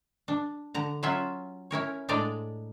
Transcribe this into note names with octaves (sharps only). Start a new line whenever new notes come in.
D4
D3 A#5
F#3 C#4 F4 E5
C#4 E4 A#4 C#5
A2 G#3 D4 D5 D#5 A#5